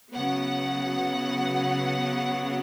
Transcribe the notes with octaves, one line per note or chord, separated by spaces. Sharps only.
C#3 F#3 B3 F#5